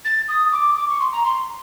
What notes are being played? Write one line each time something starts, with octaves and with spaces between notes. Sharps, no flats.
A6
D#6
D6
D6
C#6
C6
A#5
C6